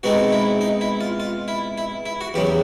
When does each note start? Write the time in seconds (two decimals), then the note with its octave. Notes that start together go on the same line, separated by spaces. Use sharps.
0.03 B2 G#3 C4 D#4 F#4
0.32 E4
0.61 D#4
0.81 E4
1.01 F4
1.20 F4
1.48 E4
1.78 E4
2.06 E4
2.21 F#4
2.34 E2 C#3 F#3 G4